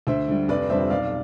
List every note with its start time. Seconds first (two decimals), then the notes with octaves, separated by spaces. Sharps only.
0.07 D2 C5 E5
0.28 D3 G3
0.48 F1 B4 D5
0.70 F2 D3 G3 C5 E5
0.90 B1 D5 F5